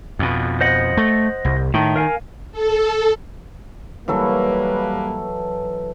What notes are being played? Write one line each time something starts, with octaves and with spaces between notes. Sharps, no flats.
F2 B2
C5 D#5 F#5
A3
C2
A2 D#3
A#4 F5 G#5
A4
E3 F#3 G3 A#3 A4 B4